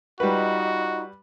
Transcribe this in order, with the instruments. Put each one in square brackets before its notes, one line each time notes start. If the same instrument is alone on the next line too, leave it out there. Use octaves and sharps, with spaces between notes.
[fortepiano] G3 B4 [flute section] D#4 F4 D#5 [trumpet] F#4